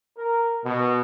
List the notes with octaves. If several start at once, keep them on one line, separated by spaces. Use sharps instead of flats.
A#4
B2